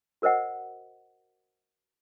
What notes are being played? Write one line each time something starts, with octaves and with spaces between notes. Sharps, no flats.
F#4 A#4 C5 D#5 F#5